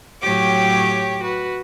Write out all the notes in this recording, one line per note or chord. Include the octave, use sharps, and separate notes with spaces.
A2 F#3 G4 C#5 G5 D6
F#4 B4